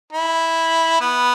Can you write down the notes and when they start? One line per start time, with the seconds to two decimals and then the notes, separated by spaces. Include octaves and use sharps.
0.13 E4
1.01 B3